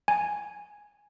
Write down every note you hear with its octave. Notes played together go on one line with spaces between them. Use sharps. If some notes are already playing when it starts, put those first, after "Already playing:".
G#5